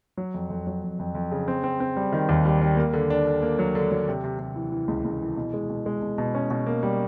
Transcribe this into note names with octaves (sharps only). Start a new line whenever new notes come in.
F#3
F2
F2
F#3
F2
F2
F2
C#3
C4
C4
C4
G3
D#3
D#2
G3
G3
A#3
D3
D4
D3
A#3
F#3
D3
F#3
C3
C3
C3
E3
E3
C#2
C#2
E3
B2
G#3
B2
G#3
B2
B2
C#4
B2
A#3
G3